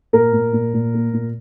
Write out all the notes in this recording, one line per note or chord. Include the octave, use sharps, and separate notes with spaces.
A#2 A#4
A#2
A#2
A#2
A#3
A#2